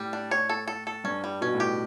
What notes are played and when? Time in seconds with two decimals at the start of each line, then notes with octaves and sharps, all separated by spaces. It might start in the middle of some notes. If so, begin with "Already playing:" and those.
Already playing: A2 G3
0.13 D4
0.31 C#5
0.49 A4
0.68 A4
0.87 A4
1.04 G2 C#4
1.24 G3
1.41 B2 C#4
1.54 A2
1.60 G4